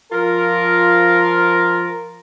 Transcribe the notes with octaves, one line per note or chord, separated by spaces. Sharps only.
F3 F4 A#4